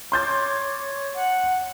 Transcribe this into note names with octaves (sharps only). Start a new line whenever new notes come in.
C#5 C6 D6 G6 A6
F#5